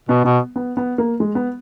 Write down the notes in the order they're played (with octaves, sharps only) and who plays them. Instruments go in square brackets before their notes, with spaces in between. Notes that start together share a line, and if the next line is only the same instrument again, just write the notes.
[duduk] B2 [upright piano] B3
[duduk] B2 [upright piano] B3
[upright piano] B3
B3
A#3
G#3
B3